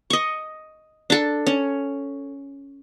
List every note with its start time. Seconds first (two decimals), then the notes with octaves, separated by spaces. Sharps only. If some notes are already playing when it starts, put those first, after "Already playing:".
0.10 D#5 C#6
1.10 D4 A4
1.47 C#4